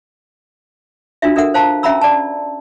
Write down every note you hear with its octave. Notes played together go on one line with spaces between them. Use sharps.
D4 F4 F#4 E5
D4 A4 A#4 E5 F#5
C5 F5 A5 A#5
C#4 E5 F#5 A#5 B5 E6
D5 A5